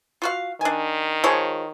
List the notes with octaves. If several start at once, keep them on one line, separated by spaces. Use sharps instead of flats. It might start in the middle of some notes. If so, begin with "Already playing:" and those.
F4 F#4 F5
D#3 D4 G#5
F3 G#3 C#5